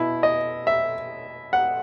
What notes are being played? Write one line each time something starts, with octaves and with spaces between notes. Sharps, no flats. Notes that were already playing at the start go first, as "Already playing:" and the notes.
Already playing: B2 E4
D#5
E5
F#5